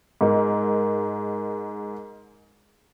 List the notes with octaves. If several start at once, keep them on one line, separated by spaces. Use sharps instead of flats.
G#2 A#4